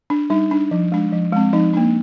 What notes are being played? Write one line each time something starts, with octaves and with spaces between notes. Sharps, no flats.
D4
G3 D#4
D4
F3
G#3 D4
F3
G#3 C4
F3 D#4
A#3 D4